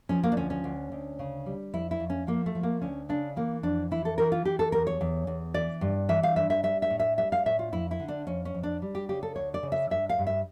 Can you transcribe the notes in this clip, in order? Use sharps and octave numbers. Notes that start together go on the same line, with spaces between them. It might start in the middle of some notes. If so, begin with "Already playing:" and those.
F3 C#4
A#3
D4
D2 C#4
C#4
D2
D2
C#3
G3
F2 E4
E4
F2
C#4
F3 A#3
A3
F3
A#3
D2 C#4
C#3 D4
E3 A#3
F2 D4
E3 E4
A4
E3 A#4
F4
E3 G4
A4
E2 A#4
C#5
E2
E2
E3 D5
G2
E3 E5
F5
G2 E5
E5
G3 E5
E5
A2
E5
G3 E5
F5
A2 E5
F4
F2 E4
E4
D3
D4
F2 C#4
C#4
F2
D4
G3
G4
C#3 G4
A4
D2 C#5
D5
C#3
E5
G2 E5
F5
G2
E5